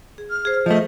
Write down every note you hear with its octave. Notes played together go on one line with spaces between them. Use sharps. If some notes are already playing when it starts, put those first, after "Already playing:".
G#4
F6
G#4 C5
F3 A3 D#5